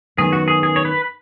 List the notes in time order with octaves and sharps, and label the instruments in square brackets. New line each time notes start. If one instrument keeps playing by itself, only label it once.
[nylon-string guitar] F#2 D#3 B3 [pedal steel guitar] G#4
[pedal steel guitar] F#4
G#4
G#4
C#5
B4